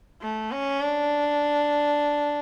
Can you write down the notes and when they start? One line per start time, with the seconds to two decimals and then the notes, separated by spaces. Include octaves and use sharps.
0.22 A3
0.51 C#4
0.81 D4